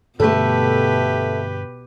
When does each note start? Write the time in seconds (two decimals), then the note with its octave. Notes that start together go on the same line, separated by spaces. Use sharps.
0.20 G2 B2 D3 A3 G4 A4 B4